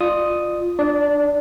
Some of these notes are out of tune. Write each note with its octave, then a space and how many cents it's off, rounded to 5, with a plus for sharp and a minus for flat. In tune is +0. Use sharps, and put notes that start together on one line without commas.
F4 +0 D5 +35 D#6 +0
D4 +15 D5 -20